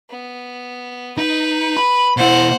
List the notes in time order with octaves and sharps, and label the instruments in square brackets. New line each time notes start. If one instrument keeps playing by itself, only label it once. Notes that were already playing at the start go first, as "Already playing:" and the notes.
[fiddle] B3
[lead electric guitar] D#4 [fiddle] B4
[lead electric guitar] B5
[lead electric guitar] B2 E4 [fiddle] C5 F#5